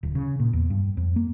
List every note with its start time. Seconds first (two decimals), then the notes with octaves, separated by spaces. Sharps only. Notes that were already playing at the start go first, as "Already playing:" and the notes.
0.03 D1
0.15 C#3
0.40 A#2
0.53 E2
0.70 G2
0.97 F2
1.16 A#3